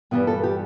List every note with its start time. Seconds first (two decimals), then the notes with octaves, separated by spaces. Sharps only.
0.11 G2 E3 G3 B3
0.27 A4
0.43 G4